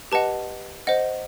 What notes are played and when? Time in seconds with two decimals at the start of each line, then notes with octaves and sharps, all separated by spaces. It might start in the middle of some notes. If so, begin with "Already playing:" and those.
0.12 G4 B4 D#5 F#5 A5
0.87 C5 D#5 F#5